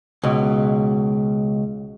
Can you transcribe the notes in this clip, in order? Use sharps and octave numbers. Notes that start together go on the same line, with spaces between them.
C#2 B2